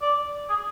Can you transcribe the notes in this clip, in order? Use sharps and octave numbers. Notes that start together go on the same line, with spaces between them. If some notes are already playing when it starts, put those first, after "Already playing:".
D5
G#4